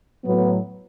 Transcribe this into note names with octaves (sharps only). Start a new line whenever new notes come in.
A2 F#3 B3